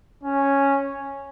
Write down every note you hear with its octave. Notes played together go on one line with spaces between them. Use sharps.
C#4